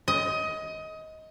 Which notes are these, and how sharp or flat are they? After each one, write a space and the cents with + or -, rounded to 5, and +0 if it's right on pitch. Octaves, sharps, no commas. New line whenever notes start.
D#5 +20